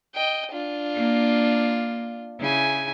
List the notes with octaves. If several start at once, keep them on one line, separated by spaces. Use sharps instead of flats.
D#5 G5
D4 F4
A#3
C#3 E4 G#5